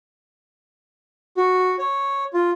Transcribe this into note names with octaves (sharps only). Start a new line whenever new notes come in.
F#4
C#5
F4